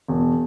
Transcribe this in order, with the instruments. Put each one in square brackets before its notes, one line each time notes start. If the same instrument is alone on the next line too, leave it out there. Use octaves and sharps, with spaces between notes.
[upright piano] E1